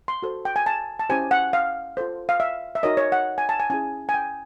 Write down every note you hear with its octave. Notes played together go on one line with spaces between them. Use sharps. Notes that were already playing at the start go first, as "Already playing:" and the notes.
C6
F#4 A4 C5
G5
G#5
A5
A5
C#4 E4 G4 C5 G#5
F#5
F5
F4 A4 C5
F5
E5
E5
D#4 F#4 A#4 C#5 D#5
C#5
F#5
G#5
A5
G#5
C#4 E4 G#4 G#5
G#5
G5